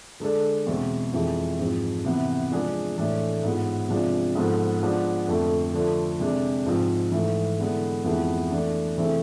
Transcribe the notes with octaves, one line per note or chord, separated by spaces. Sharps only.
D3 G#3 D4 A4
E2 B2 G#3 C4
F2 E3 G#3
G#2 F3 G#3 C4
C3 E3 B3
F3 G#3 D4 G#4
A2 E3 A3 D4 G#4
G#2 G#3 B3 F4
C3 F3 G#3 D4 F4
G#2 F3 B3 F4 A4
F3 G#3 B3 D4
F2 D3 A3
D3 F3 A3
C3 G#3 D4
G#2 F3 G#3 C4
G#2 E3 A3
D3 G#3 B3 E4
F2 E3 G#3 B3 E4
E3 A3 D4
C3 E3 A3 C4 G#4